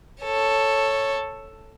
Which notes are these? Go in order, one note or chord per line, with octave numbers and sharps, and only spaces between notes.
A4 C#5